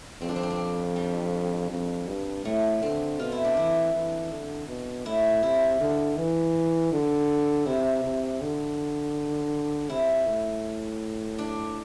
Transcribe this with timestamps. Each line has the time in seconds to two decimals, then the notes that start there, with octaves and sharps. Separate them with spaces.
0.21 F2 C4
0.29 D4
0.36 C4
0.43 D4
0.50 C4
0.96 G3
1.70 F2
2.08 G2
2.45 A2 A3
2.82 D3 C4
3.19 B2 F4
3.32 E4
3.45 D4
3.57 E3 E4
3.94 E3
4.31 D3
4.68 B2
5.05 A2 E4
5.43 C3 E4
5.80 D3
6.17 E3
6.92 D3
7.66 C3 E4
8.04 C3
8.41 D3
9.89 C3 E4
10.26 A2
11.39 D4